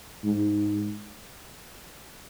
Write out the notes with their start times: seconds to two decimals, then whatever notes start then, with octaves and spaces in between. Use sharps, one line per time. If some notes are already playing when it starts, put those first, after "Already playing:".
0.25 G#2